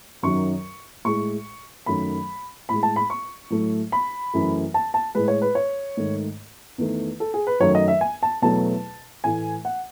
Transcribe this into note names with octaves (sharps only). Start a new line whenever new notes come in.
F#2 D#3 F#3 C#6
A2 G#3 C#6
F#2 D#3 F#3 A3 B5
A2 G#3 B5
A5
B5
C#6
A2 F#3 A3
B5
F#2 E3 A3
A5
A5
A2 G#3 B4
C#5
B4
C#5
G#2 D#3 A3
E2 D#3 A3
A4
G#4
B4
F#2 D#3 F#3 A3 C#5
D#5
E5
G#5
A5
E2 B2 F#3 A3 A5
A2 E3 A3 G#5
F#5